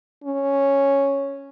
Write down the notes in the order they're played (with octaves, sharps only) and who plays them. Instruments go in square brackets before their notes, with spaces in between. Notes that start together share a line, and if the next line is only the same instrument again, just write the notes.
[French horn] C#4